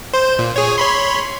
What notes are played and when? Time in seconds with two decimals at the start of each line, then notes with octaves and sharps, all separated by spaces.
0.14 C5
0.39 A#2
0.56 G#4 C#5
0.78 C#5 B5 C6